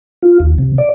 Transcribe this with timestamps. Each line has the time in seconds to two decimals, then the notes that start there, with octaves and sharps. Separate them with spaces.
0.22 F4
0.40 D#2
0.58 C3
0.78 D5